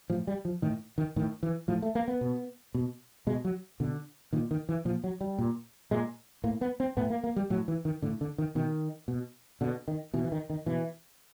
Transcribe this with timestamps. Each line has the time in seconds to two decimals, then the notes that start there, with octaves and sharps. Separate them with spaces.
0.10 A2 F3
0.27 G3
0.45 F3
0.62 A2 D#3
0.98 D#3
1.16 A2 D#3
1.43 E3
1.68 A2 F3
1.82 A3
1.95 A#3
2.08 B3
2.21 B2
2.75 B2
3.27 B2 G#3
3.45 F#3
3.80 B2 D3
4.33 A#2 D#3
4.51 D#3
4.69 E3
4.85 A#2 F3
5.04 F#3
5.21 G3
5.39 A#2
5.91 A#2 G#3
6.44 A2 A#3
6.61 B3
6.80 C4
6.97 A2 B3
7.10 A#3
7.24 A#3
7.36 G3
7.50 A2 F#3
7.68 E3
7.85 D#3
8.02 A2 D3
8.21 D3
8.38 D#3
8.55 B2 D#3
9.08 B2
9.61 B2 D3
9.88 D#3
10.14 B2 E3
10.24 E3
10.32 D#3
10.50 D#3
10.66 B2 E3